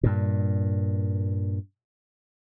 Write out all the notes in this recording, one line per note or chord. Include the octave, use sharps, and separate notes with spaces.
G2 A#2